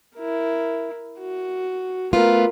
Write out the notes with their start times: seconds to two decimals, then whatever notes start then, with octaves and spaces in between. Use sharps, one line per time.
0.16 E4 A#4
1.18 F#4
2.13 A3 B3 F4 A#4